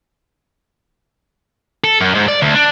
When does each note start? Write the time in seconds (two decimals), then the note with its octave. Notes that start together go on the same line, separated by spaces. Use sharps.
1.84 A4
2.01 F#2
2.15 G#2
2.28 D5
2.42 D2
2.55 D4